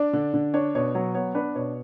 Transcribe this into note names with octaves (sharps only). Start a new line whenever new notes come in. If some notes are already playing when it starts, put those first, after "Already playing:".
Already playing: D4 D5
D3
D3
D4 C#5
B2 C#5
F#3 C#5
B3 C#5
D4 B4
B2 C#5